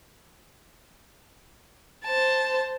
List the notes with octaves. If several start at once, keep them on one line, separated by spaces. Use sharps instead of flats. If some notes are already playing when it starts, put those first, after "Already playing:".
C5 A5